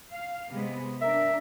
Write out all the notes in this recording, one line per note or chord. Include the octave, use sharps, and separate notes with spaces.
F5
C3 G#3 B3
D4 A#4 E5